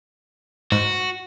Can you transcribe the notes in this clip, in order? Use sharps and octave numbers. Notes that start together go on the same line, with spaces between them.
G#2 F#4